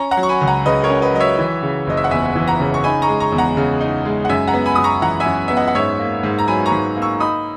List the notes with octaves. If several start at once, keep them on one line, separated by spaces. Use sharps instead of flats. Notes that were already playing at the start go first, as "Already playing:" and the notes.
Already playing: C#4 A#5 C#6
F#5 A#5
F#3
C#6
G#5 B5
C#2
F#5 A#5
C#3 B4 D#5
A#4 C#5
C#4
B4 D#5
F#3 D#5
C#5 E5
E3
C#3
F#1 D#5
E5
F#5
E2 E5 G#5
E3
F#5 A#5
C#3
C#6
D#4 G#5 B5
A#5 C#6
G#3
A#5 C#6
E2
F#5 A#5
C#3
D#4
G#3
F#5
F#2 E5 G#5
F#5 A#5
B3
G#5 B5
F#2 D#6
A#5 C#6
E3 F#5 A#5
E5 G#5
F#2
B3 E5
D#5 F#5
F#5
G#2 C#5 E5
A#3
G#2
A#5
F#3 G#5 B5
A#5 C#6
G#2
A#3
C#6 E6
D#4 B5 D#6